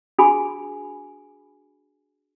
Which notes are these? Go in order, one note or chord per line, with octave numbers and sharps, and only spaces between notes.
D4 F#4 G#4 G#5 B5